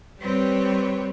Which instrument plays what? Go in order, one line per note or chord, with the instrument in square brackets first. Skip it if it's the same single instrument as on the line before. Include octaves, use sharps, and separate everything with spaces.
[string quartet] G3 C4 G4 B4 C#5